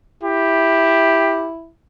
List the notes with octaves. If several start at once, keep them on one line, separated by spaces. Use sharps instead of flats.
E4 G4